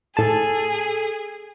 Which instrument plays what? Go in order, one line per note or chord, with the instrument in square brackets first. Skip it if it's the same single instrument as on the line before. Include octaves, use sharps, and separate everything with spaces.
[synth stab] A2 A5 [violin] G#4 [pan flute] A4